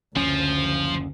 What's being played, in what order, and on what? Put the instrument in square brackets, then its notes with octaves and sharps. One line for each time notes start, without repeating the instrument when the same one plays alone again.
[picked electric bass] F#1 C#4 [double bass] D2 [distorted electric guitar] F3